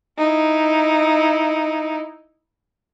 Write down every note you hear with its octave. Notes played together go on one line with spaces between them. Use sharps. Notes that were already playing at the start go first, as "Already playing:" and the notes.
D#4 E4